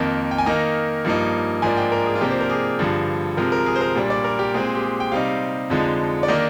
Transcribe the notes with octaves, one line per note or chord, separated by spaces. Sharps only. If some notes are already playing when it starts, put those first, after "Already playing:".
Already playing: F2 D#3 A#3
G5
G#5
D#3 A#3 D#4 A#5
G2 F3 A#3 D#4
G#2 F3 A#3 D4 G#5
G5
A#4
G#4
F4
C3 F3 A#3 D4 G4
C5
A#4
G#4
G2 D3 F3
C3 F3 G#3 A#4
A#4
G#4
C5
A#4
A#2 G3 D4
D5
A#4
G4
A#2 G#3 C4 G#4
G4
G#4
G5
C3 G3 C4 D#4 F5
F2 D3 F3 G#3 D#4
D5
D#3 A#3 D4 D#5